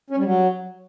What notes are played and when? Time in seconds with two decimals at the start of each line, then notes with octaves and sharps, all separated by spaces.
0.10 C#4
0.17 G3
0.24 F#3